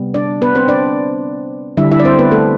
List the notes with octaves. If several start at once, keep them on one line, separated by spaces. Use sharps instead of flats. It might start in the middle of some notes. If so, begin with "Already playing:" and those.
Already playing: C3 G3 B3
D4 D5
B3 B4
C4 C5
D4 D5
D3 G3 D4 E4 E5
E4 E5
D5
C4 C5
B3 B4
A3 A4